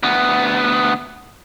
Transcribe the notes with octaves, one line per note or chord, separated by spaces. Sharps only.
D2 B3